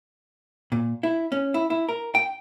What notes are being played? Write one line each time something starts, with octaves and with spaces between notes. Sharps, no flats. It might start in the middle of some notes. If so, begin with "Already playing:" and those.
A#2
E4
C#4
E4
E4
A#4
G5